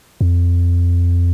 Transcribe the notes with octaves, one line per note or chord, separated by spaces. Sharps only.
F2